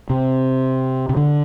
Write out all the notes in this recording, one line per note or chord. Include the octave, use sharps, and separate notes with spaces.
C3
C3
D3